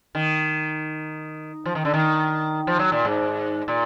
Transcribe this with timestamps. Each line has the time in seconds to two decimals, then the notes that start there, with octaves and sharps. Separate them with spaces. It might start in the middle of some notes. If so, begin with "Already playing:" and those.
0.15 D#3
1.66 F3
1.75 D#3
1.85 D3
1.94 D#3
2.67 F3
2.79 F#3
2.92 A#2
3.05 G#2
3.68 A#2